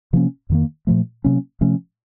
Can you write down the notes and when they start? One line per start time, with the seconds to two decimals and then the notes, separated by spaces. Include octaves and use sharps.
0.13 C3 F3 A#3 C#4
0.49 F2 D#3 A#3
0.87 A#2 F3 A3
1.24 C3 F#3 A#3 C#4
1.61 C3 F3 A3 C#4